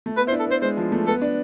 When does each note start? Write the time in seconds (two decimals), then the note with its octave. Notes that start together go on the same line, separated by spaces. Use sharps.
0.06 A3
0.17 B3 B4
0.27 E4 C5
0.32 D4
0.39 A4
0.47 B3 C5
0.62 G#3 C5
0.77 F3
0.92 A3
1.07 B3 A4
1.22 D4